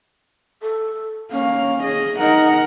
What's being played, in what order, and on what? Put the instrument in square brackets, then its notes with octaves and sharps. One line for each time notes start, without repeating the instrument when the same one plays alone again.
[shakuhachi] A4
[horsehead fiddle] A#3 F5 [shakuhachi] C#4
[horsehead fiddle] G#4 D#5
[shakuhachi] D#4 [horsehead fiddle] A#4 F#5